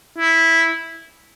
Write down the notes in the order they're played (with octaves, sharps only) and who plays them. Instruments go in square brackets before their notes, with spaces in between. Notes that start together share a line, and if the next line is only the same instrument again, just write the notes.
[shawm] E4